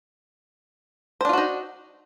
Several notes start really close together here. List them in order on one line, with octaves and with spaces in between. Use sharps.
C5 D4 F4 F#4 D#4